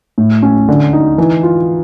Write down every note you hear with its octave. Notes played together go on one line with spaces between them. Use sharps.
A2
C#4
D3
D#4
E3
F4